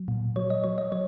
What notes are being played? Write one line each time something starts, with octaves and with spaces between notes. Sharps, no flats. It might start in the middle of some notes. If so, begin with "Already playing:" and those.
Already playing: F#3
A#2
F#3 C#5
D#5
F#3 C#5
D#5
F#3 C#5